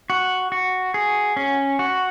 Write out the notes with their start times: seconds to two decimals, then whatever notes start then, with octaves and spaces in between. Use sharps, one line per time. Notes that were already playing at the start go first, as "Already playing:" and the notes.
0.10 F#4
0.52 F#4
0.94 G#4
1.37 C#4
1.79 F#4